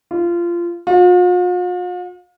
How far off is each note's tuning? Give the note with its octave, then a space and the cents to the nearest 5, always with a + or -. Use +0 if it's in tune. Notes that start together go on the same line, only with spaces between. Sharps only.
F4 -20
F4 +45